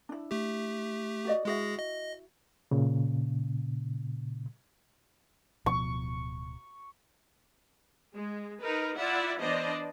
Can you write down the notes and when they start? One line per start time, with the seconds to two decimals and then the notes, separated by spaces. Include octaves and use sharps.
0.09 D4 E4
0.31 A3 G4
1.25 F#4 D5 D#5
1.45 G#3 E4 F#4 G#4 E5 A#6
1.79 D#5
2.71 A#2 C#3
5.66 D1 B2 F3 C#6
8.14 G#3
8.61 D#4 A#4 B4
8.97 E4 F4 D5 E5 F#5
9.39 E3 B3 D4 C5 D5 D#5